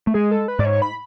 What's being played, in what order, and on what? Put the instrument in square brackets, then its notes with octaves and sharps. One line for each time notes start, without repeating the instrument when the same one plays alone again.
[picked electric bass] A3
[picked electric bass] G#3 [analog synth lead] G#4
[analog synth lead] A4
B4
[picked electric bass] G#2 [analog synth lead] D5
[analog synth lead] C#5
B5